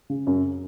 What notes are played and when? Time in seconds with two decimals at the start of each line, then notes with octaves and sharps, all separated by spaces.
0.10 C#3
0.27 F#2